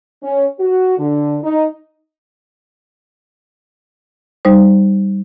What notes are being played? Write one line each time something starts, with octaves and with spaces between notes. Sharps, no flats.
C#4
F#4
D3
D#4
G3 D#4 C5